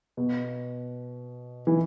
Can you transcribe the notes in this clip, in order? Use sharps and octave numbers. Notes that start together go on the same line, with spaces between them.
B2
E3